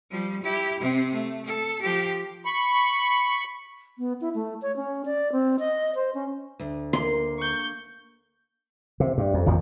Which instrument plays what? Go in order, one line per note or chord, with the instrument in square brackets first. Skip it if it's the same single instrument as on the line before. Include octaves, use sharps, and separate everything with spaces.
[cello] F3 G3
E4 G4
C3 C4
A3
A4
F3 G4
[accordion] B5 C#6
[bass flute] B3
E4
A3
C#5
C#4
D5
C4
D#5
C5
C#4
[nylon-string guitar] D2
[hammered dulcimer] A#3 [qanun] C6
[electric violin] C#6 G6
[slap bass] C3
G2
F2
G#1 F2 A#2 F3